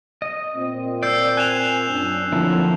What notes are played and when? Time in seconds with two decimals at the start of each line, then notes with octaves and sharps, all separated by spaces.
0.22 D#5
0.55 A#2 C4
1.03 D5 E6 G6 C7
1.37 G#5 F#6 E7 F7
1.89 F#2 D4
2.32 D3 F3 F#3 A#3 C4 E4